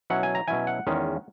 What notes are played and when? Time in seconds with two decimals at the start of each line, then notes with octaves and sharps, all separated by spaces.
0.10 B2 F#3 C#4 E4 F#5
0.23 G#5
0.35 A#5
0.48 B2 F#3 C#4 E4 G#5
0.67 F#5
0.87 E2 D#3 G#3 C#4